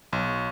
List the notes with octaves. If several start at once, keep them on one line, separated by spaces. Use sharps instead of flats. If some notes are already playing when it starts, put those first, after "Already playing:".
B1